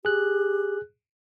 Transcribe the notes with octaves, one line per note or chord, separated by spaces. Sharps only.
G4 G#4 F#6